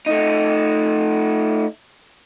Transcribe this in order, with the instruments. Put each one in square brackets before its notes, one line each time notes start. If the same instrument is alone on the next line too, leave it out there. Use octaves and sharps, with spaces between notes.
[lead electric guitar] A3 D#4